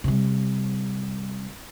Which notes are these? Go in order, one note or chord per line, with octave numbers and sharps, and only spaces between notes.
C3 G3